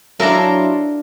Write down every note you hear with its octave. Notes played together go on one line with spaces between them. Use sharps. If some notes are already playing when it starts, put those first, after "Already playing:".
F#3 D4 E4 F4 A#4 A#5